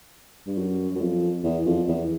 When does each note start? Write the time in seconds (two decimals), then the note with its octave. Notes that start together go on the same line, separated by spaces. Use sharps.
0.46 G2
0.58 F#2
0.95 F#2
1.00 F2
1.44 E2
1.66 F2
1.88 E2